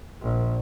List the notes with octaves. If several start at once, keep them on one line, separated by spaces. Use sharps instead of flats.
A#1